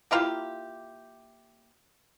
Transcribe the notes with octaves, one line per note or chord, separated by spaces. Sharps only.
A#3 E4 F4 G4